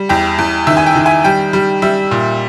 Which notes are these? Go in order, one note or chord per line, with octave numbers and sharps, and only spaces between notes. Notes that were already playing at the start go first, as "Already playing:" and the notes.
Already playing: G3
E2 G5
E2
D#3 E5
G#5
G5
D#3
G#5
G3 G5
G3
G3 E5
A#2